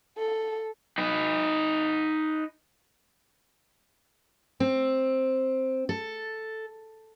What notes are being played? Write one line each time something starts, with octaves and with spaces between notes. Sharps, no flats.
A4
D#4 B4
C4
A4